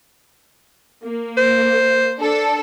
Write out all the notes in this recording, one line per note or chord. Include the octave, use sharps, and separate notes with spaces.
A#3
C5
D4 A4